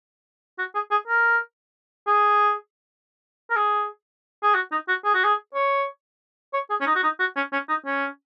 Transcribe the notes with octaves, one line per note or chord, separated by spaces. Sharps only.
F#4
G#4
G#4
A#4
G#4
A#4
G#4
G#4
F#4
D#4
F#4
G#4
F#4
G#4
C#5
C#5
G#4
C#4
D#4
F#4
D#4
F#4
C#4
C#4
D#4
C#4